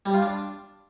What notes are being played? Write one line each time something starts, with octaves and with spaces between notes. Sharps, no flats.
G3
F4
D4